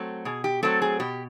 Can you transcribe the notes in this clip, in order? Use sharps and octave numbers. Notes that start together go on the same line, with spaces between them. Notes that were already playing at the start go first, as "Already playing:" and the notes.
Already playing: F#3 A3 C4
B2 G#4
G4
F#3 A3 C4 A4
G#4
B2 G4